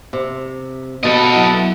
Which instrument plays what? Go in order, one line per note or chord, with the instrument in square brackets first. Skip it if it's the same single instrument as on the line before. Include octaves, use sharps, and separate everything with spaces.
[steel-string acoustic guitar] C3
[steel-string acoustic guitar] B2 B3 [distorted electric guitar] A4 D#5
[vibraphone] F#3 E4 E5